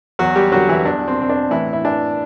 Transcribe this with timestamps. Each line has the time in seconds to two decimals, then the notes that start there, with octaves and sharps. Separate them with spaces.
0.19 E2 F#3 F#4
0.36 G3 G4
0.52 D3 F#3 F#4
0.69 E3 E4
0.85 E2 D4
1.08 C4
1.19 B2 C4
1.29 D4
1.51 A2 E3 E4
1.73 E4
1.84 E3 D4